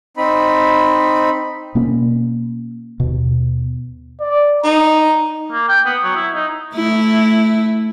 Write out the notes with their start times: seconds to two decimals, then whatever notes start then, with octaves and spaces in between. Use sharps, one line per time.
0.17 C4 D#4 B5
1.75 B2 A#3 C#4
3.00 D#2 B2
4.21 D5
4.64 D#4 A#5
5.52 A#3
5.68 G5
5.85 B3
6.04 F#3
6.16 E4
6.34 D#4
6.75 A3 E4